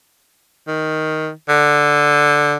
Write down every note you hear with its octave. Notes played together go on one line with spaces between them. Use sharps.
D#3
D3